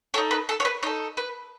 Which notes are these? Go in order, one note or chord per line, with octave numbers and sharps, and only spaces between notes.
D#4 A4 C#5
B4
A4
C#5
B4
D#4 A4 C#5
B4